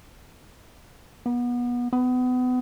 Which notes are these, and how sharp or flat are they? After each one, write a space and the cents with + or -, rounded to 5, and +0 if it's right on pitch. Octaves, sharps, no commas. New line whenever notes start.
B3 -25
B3 +30